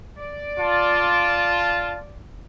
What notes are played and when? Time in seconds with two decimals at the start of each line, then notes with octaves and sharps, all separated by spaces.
0.18 D5
0.59 F4 A5